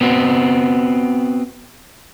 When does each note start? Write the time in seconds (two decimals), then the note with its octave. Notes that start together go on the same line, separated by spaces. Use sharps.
0.01 B3 C4 F#4